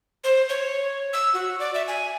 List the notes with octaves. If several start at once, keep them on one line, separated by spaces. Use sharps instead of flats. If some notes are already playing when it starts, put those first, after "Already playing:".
C5
C#5
E6
F#4
D5
E5
G#5